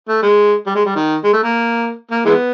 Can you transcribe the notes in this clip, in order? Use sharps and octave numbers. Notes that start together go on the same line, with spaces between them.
A3
G#3
G3
G#3
G3
D#3
G#3
A3
A#3
A#3
E3 G#3 B3